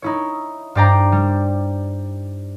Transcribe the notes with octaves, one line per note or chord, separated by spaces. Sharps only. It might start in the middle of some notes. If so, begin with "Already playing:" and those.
D#4 E4 C#5
G2 C5 D5 G5 A#5
G3